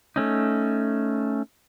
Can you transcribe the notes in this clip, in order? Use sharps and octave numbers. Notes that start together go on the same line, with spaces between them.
A3 C#4 D#4